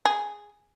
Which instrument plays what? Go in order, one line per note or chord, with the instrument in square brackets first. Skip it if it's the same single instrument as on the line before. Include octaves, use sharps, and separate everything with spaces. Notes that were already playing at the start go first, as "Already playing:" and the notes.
[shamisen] G#4